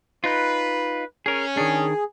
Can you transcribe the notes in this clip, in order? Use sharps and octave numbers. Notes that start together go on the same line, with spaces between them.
D#4 F4 B4
C#4 G#4 A#4
D#3 D4 G#4